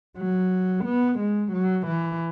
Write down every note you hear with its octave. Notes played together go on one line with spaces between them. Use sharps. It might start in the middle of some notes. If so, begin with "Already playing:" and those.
F#3
B3
G#3
F#3
E3